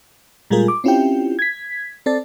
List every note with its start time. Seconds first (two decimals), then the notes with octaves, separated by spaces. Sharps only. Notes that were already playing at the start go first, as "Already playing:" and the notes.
0.50 A#2 G3 G#3 F4 G#4 A#4
0.68 D6
0.84 C4 C#4 E4 F4 G4 G5
1.39 G#6 B6
2.06 C4 A4 D5 A6